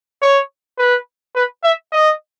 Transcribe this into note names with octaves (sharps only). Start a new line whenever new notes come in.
C#5
B4
B4
E5
D#5